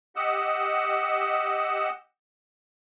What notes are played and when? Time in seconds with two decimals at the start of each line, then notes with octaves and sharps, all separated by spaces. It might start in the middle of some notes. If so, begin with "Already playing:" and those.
0.16 G4 D#5 F#5 E6